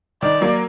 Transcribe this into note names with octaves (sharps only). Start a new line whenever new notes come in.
D#3 D5
F#3 A#3